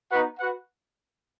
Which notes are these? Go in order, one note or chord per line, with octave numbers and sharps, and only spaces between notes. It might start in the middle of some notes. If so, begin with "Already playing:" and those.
B3 D#4 F#4 B4 F#5
F#4 B4 F#5